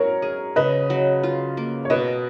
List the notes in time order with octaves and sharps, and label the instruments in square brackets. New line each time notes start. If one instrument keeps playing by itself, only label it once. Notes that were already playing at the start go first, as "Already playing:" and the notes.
Already playing: [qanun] F#3 C#4 [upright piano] A#4 C#5
[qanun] G#4
[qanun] C#3 [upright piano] B4 D#5
[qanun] F#3
F4
A#3
[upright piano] C#5
[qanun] B2 [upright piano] B4 D#5